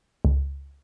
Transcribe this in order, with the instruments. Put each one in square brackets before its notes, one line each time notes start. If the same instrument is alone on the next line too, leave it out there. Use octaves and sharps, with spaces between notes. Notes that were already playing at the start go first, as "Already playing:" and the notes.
[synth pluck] C#2